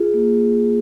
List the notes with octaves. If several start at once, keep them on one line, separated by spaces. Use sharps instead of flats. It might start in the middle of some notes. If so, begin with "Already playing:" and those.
Already playing: F4 G#4
A#3